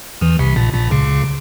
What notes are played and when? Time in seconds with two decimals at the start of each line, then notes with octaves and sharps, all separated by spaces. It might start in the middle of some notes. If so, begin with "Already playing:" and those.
0.21 E2 E3
0.39 C2 C3
0.56 A#1 A#2
0.74 A#1 A#2
0.91 C#2 C#3